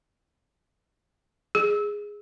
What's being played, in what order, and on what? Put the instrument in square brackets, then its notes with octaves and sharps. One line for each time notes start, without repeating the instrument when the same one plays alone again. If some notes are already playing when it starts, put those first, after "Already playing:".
[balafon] G#4